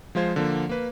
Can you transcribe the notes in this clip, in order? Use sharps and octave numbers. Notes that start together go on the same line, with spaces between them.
F3 G#3 F4 C5 G#6
D3 F3 A#3
A#3 B4